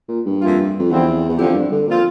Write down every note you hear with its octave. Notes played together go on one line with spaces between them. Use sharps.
A#2
G2
F2 E3 A#3 F4
F2
E2 D3 F3 C4 E4 G4
E2
F2 D3 F3 C4 E4 G4
F2
G2
D3
A#2 F3 C4 F4